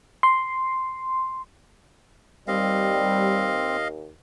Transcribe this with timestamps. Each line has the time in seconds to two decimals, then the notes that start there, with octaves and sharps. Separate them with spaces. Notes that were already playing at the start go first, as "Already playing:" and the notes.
0.23 C6
2.48 D#2 G3 C4 D#5 F5